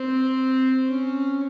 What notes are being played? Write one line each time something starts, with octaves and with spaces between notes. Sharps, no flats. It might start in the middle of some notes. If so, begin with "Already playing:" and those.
Already playing: C4
C#4